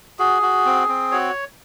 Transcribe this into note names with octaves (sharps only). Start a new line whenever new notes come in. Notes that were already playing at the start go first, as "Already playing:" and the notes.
F#4 G#4
F#4
C4
C4
F#4 C#5